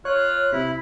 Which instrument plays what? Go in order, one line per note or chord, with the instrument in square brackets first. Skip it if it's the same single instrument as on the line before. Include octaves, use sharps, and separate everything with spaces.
[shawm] F4 [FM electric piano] C#5 [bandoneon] F#6
[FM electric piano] C3 [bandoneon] E4 [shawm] B5